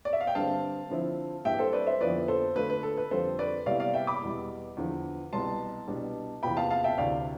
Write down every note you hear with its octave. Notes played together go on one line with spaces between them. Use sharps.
D5
E5
F5
G5
G2 D3 G3 C4 F5 A5
D3 F3 C4 E4
G2 E3 G3 E5 G5
A4 C5
B4 D5
C5 E5
F2 D3 F3 B3 E4 B4 D5
A4 C5
D3 A3 D4 F4 B4
B4
A4
B4
F2 D3 G3 C4 F4 A4 C5
B4 D5
C3 G3 B3 E4 D5 F5
D5 F5
E5 G5
B5 D6
E2 B2 G3
E2 D3 F3
C2 B2 G3 B3 A5 C6
C2 B2 G3 D4
E2 C3 E3 B3 F4 G5 B5
F5 A5
F5 A5
E5 G5
D2 C3 E3 D5 F5